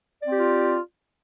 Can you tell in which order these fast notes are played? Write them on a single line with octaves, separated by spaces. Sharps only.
D5 C4 G4 F4